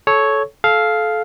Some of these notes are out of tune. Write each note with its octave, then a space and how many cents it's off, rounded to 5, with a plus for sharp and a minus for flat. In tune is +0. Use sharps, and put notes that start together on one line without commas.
A4 -20 C#5 +0
A4 -25 F5 +0